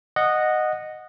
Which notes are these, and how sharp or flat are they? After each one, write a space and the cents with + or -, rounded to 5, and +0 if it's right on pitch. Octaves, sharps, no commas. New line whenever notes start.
D#5 -10 F#5 -5